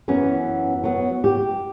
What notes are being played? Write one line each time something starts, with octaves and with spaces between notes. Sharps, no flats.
F#2 E3 B3 C#4
F#3 B3
G4